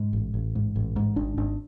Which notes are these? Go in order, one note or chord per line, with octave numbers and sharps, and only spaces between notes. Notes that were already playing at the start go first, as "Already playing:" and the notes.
Already playing: G#2
A1
A1
G#2
A1
G#2
G#1 D4
G#1 D4